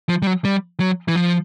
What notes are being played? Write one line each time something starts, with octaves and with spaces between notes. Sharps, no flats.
F3
G3
F#3
G3
F#3
E3
F3